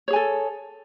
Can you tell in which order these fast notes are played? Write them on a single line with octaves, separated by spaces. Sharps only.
C#5 G#4 G#5 A4